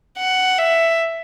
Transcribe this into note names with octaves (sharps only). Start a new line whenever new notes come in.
F#5
E5